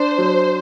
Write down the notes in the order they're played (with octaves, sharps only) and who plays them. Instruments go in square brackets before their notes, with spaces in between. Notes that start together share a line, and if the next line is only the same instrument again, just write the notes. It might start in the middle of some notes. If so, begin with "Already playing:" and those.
Already playing: [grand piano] D4 [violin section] C5
[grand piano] F#3